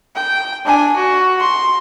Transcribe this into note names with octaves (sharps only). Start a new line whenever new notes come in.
G5
D4 G#5
F#4
C6